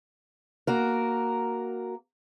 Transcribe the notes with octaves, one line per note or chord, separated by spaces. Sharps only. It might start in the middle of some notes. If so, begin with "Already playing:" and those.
A#3 F#4 A#4